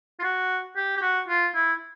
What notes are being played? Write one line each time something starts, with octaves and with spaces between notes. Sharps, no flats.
F4
F#4
G4
G4
F#4
F4
E4